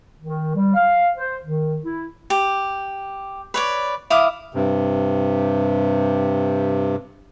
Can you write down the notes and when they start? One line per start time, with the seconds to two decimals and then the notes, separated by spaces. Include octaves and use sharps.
0.21 D#3
0.55 G3
0.75 F5
1.17 C5
1.44 D#3
1.84 E4
2.30 G4
3.54 B4 C#5 D5
4.10 E4 F5 D6 D#6
4.54 G2 C3